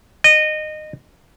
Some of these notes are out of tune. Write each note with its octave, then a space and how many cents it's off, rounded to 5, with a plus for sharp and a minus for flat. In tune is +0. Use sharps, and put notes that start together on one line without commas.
D#5 -20